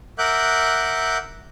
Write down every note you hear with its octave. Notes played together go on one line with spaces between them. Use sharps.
A#4 E5 F#5 D6 F#6 G6